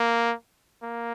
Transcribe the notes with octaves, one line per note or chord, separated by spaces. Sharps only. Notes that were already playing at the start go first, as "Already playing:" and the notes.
Already playing: A#3
A#3